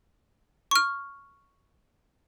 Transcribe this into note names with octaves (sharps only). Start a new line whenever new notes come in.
C#6 F6